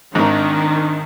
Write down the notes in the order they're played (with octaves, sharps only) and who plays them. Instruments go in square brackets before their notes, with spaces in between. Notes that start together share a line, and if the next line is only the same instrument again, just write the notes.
[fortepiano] G#1 G#2 [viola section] D#3 [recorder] D4